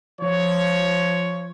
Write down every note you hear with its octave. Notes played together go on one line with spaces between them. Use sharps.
F3 C#5